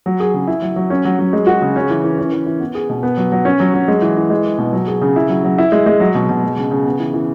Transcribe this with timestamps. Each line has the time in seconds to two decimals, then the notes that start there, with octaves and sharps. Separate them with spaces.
0.06 F#3
0.20 G#4
0.34 C#3
0.47 E4
0.62 F#3
0.76 F#3
0.90 C#4
1.05 F#3
1.19 F#3
1.33 G#3
1.47 F#4
1.62 C#3
1.76 C#4
1.90 E3
2.04 E3
2.18 C#4
2.32 E3
2.46 E3
2.60 B3
2.75 G#4
2.90 B2
3.03 B3
3.17 F#3
3.32 F#3
3.45 C#4
3.60 F#3
3.74 F#3
3.88 G#3
4.02 E3
4.17 E3
4.30 G#3
4.45 G#4
4.58 B2
4.73 F#3
4.87 G#4
5.02 C#3
5.16 E4
5.29 F#3
5.44 F#3
5.58 E4
5.72 G#3
5.86 G#3
6.00 F#3
6.15 B2
6.29 B2
6.43 G#3
6.57 C#3
6.71 C#3
6.85 B3
6.99 E3
7.14 E3